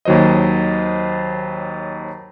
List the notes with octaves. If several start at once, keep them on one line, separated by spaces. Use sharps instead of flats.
D#2 D#3 F#3 C5 D#5